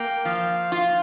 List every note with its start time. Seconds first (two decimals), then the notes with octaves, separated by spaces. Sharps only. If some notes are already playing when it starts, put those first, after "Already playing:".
Already playing: A#3 G5
0.25 F3 F5
0.72 F4